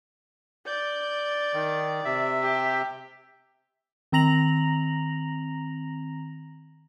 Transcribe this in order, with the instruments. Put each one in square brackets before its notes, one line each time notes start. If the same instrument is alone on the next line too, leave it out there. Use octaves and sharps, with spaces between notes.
[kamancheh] D5 [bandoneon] G6
[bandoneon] D#3
C3 E5
[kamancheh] G4
[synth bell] D#3 C4 A#5 A#6 F7 F#7